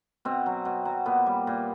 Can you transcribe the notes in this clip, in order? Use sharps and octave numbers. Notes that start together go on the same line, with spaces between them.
B2 C4
F#3
B2
F#3
A#2 B3
G3
A#2